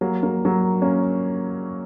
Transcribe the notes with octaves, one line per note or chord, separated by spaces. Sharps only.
F#3 A#3
F#3 A#3
F#3 A#3
A#3 C#4